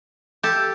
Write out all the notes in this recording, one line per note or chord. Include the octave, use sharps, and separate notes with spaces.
G4 A4